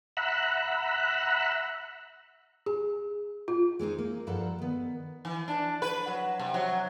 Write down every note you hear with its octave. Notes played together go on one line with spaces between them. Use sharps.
E5 F#5 A#5 B5 E6 F#6
G#4
F4
G#3 C4 C#4 D#4
A#3
G2 F3 A4 F#5 A#5
D#3 B3
E3
D4
B4
F#3
C3
F#3